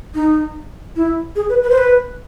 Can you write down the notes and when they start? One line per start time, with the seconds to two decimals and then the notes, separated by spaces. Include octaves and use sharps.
0.15 D#4
0.96 E4
1.36 G#4
1.49 B4
1.63 B4
1.70 C5
1.78 B4